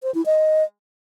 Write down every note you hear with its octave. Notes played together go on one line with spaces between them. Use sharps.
C5
E4
D#5